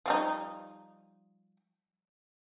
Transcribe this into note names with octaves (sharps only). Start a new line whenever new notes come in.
F3 G3 D#4